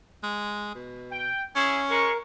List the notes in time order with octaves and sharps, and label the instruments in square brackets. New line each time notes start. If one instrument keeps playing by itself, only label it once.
[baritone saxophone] G#3
B2
[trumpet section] G5
[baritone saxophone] C#4 [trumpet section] E4 G#4 C#5
[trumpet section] G#3 C#6 [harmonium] A#4